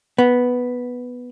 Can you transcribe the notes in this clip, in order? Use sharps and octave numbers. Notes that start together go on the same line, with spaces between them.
B3